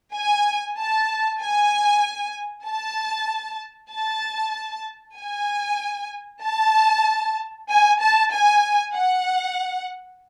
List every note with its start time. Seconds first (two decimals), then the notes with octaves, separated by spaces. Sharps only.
0.14 G#5
0.77 A5
1.40 G#5
2.66 A5
3.92 A5
5.18 G#5
6.44 A5
7.69 G#5
8.01 A5
8.32 G#5
8.95 F#5